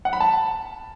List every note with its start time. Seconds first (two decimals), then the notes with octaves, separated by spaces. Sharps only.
0.05 F#5
0.13 B5
0.20 A5